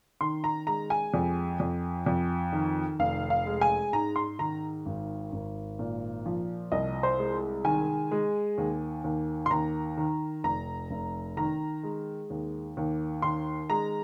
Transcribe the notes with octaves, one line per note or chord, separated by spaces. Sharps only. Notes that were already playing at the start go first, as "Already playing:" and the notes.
D#3 C6
A#5
G#3 A#5
G#5
F2
F2
F2
D#3
F1 F5
F5
G#3
G#5
G#2 A#5
C6
D#3 A#5
G#1
G#1
A#2
F3
C2 D#5
C5
G#3
D#3 G#5
G#3
D#2
D#2
C6
D#2 A#5
D#3
F1 A#5
F1
D#3 A#5
G#3
D#2
D#2
D#3 C6
G#3 A#5